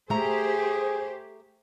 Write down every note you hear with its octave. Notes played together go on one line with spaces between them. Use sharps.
A3 G4 G#4 C5 A#5